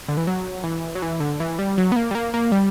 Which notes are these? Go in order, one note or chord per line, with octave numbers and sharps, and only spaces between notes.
D3
E3
F#3
E3
F#3
E3
D3
E3
G3
F#3
B3
A#3
G3
A#3
A#3
G3